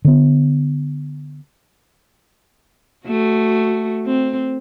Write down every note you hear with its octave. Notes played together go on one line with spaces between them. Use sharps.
D3 B3
A3 F#4
C4